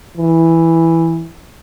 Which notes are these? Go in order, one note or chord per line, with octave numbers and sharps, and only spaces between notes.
E3